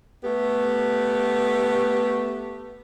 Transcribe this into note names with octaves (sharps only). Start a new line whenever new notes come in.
A3 B3 G4